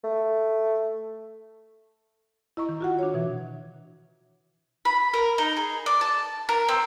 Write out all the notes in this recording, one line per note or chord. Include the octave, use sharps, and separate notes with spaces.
A3
E4 D#5 A#5 C#6
D#3
F4 F#4 F#5
D4 C#5
B2 E3
B5
A#4
D#4
G#4
D5
A5
A#4
C4